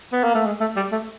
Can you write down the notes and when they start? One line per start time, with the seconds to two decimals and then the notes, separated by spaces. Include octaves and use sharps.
0.13 B3
0.24 A#3
0.35 A3
0.46 G#3
0.61 A3
0.76 G3
0.92 A3